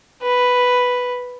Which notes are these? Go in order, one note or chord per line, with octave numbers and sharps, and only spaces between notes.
B4